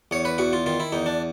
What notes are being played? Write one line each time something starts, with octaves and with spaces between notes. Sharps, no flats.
E2 C#5
B4
E2 F#4
F4
D#3 F4
E4
E2 D#4
D4